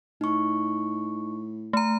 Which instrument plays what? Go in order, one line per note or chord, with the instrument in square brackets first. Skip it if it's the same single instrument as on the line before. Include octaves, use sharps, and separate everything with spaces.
[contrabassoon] A2 [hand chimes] D#4 C#6
[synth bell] A3 A#5